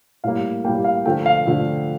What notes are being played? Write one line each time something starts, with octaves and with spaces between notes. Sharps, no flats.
A2 G3 A#3 F5
A2 G3 A#3 G5
F5
D3 F3 A3 G5
F5
D3 F3 A3